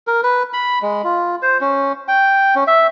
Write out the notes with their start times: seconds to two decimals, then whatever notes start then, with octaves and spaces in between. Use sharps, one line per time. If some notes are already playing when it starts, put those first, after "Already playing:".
0.07 A#4
0.23 B4
0.53 B5
0.82 G#3
1.04 F4
1.42 C5
1.61 C#4
2.08 G5
2.55 C#4
2.67 E5